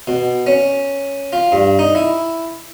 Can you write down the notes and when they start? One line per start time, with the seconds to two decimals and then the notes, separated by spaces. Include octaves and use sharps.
0.08 B2
0.47 C#4
1.33 F4
1.52 G2
1.79 D#4
1.95 E4